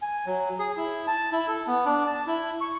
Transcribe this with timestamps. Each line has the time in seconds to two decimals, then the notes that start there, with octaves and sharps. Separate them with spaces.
0.02 G#5
0.26 F#3
0.59 G#4
0.77 E4
1.07 A5
1.32 E4
1.47 A4
1.67 B3
1.85 D4
2.07 A5
2.27 E4
2.61 C#6